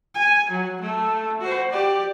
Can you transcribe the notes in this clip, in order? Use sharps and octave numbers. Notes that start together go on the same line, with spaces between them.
G#5
F#3
A3
F#4 C5
G4 D5